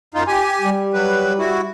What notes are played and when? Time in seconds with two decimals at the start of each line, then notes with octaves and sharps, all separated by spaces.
0.14 F#2 D#4 F4
0.27 G4 G#5
0.62 G3
0.93 F#3 B4
1.39 E4 F#4